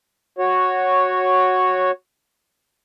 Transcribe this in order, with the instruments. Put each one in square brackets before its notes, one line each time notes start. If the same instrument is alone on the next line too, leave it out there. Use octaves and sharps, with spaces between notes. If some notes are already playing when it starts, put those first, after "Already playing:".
[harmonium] F#4 C#5